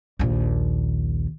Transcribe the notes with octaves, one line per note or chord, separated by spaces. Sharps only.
A#1 D#2